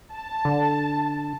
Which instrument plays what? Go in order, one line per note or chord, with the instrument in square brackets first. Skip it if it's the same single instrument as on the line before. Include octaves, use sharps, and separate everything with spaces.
[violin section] A5
[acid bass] D3